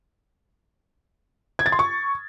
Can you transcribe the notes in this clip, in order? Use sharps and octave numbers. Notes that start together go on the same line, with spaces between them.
G#6
A6
C6
C#6